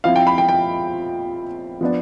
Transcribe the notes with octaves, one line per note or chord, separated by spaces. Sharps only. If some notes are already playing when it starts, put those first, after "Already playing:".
F3 C4 E4 F5
G5
B5
G5
G5
F3 B3 D4